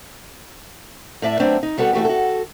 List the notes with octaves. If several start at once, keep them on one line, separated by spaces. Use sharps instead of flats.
A2 D5 E5 A5
F#3 A3 B3 C4 D4
D#4
G3 B3 F#4 A4 B4
E3 A3 F#4 G4
F#4 A4